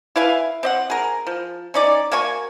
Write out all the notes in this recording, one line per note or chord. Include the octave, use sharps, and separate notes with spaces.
E4 B4 F5 G#5
C4 D#5 F#5
G#4 A#4
F3
C#4 D#4 D5
A#3 F#4 G#5 C#6